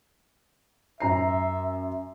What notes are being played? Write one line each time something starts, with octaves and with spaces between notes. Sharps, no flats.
F#2 E5 A#5 C7